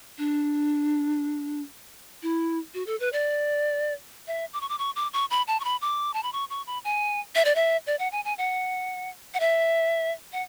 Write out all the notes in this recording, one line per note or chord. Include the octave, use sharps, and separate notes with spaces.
D4
E4
F#4
A4
B4
D5
E5
D6
C#6
D6
C#6
D6
C#6
B5
A5
C#6
B5
D6
A5
B5
C#6
C#6
B5
G#5
E5
D5
E5
D5
F#5
G#5
G#5
F#5
F#5
E5
F#5